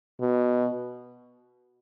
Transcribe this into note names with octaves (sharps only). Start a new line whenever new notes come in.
B2